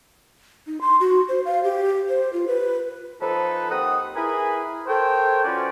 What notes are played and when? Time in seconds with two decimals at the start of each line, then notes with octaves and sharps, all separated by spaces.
0.67 D#4
0.81 C6
1.00 F#4
1.29 C5
1.45 F5
1.63 G4
2.09 C5
2.33 F4
2.48 B4
3.21 F3 D#4 A4 B4
3.69 D#2 C4 D#4 F#5 D#6
4.15 E4 G#4 A#4 B4 G#5 B5
4.86 A4 A#4 C5 C#5 G5
5.43 F3 C#4 F4 F#4 B4 D5